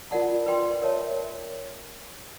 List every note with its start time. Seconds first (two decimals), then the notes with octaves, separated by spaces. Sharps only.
0.11 F4 A#4 D5 F#5 A5
0.46 B4 D5 G5 C6
0.82 A#4 C#5 E5 A5